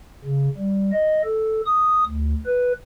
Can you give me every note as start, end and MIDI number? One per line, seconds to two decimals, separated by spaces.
0.25 0.49 49
0.57 0.91 55
0.92 1.21 75
1.24 1.61 69
1.66 2.04 87
2.06 2.34 38
2.46 2.72 71